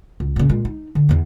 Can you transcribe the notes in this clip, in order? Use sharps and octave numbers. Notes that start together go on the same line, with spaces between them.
C#2
A#2 C#3
A#2 G#3
D#4
D3
E2 E3